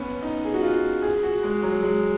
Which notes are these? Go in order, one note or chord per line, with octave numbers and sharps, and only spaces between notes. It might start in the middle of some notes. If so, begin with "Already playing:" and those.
Already playing: B3 C#4
D#4
G#4
F#4
F4
G#4
F#4
G#3
F#3
G#3